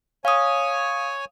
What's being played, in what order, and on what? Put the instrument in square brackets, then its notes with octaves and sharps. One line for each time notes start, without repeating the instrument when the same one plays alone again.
[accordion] C#5 G#5 [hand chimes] F5 D#6